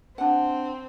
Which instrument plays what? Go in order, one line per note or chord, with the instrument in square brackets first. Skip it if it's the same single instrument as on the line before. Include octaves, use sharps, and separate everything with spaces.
[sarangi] C4 [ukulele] D4 F#5